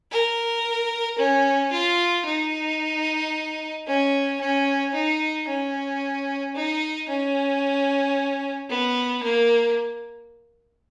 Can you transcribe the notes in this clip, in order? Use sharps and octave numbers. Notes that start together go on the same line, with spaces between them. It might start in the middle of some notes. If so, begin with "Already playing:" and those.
A#4
C#4
F4
D#4
C#4
C#4
D#4
C#4
D#4
C#4
B3
A#3